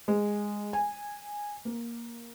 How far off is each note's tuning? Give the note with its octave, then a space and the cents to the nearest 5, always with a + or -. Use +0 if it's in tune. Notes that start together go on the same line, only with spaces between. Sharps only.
G#3 -10
G#5 -10
A#3 +10